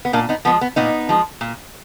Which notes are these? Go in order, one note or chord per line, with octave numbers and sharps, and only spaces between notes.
B3
A#2 A#3 D4
B3 D#4
F3 G#3 B3
B3
A#2 B3 D#4
F3 G#3
A#2